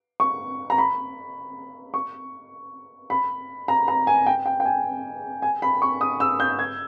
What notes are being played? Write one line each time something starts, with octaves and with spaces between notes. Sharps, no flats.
C#6
A#5
B5
C#6
B5
A#5
A#5
G#5
G5
G5
G5
G#5
G#5
B5
C#6
D#6
E6
G6
G#6